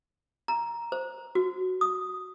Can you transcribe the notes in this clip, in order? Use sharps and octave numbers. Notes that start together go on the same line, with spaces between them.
A#5
C5
F#4
D#6